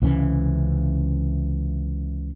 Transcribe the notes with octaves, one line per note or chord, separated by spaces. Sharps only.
C#2 C3 E3 C#4